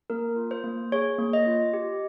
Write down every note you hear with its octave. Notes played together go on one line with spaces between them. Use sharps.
A#3 A#4
F4
C5
A#3
G#4 C#5
A#3
D#5
F4
G4